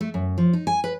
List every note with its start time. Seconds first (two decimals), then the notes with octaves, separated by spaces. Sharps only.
0.01 A3
0.14 F#2
0.38 F3
0.53 D#4
0.67 G#5
0.84 B4